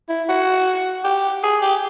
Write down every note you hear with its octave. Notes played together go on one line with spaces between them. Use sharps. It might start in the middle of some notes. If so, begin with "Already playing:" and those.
E4
F#4
G4
G#4
G4